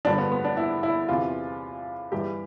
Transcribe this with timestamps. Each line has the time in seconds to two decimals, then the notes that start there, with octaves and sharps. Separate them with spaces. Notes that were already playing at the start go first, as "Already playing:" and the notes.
0.05 G2 D3 F3 D4
0.18 B3
0.32 B3
0.45 D4
0.57 E4
0.83 E4
1.09 E2 C3 E3 F4
2.12 G2 E3 G4